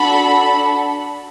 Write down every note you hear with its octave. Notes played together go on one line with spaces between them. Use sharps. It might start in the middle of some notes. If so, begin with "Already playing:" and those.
Already playing: D4 F#4 A4 B5